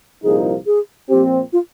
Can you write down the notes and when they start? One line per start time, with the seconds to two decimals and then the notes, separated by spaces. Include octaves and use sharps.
0.24 C2 A#2 F3 A#3 D#4 G#4
0.66 G#4
1.09 A#2 F3 C4 G4
1.53 F4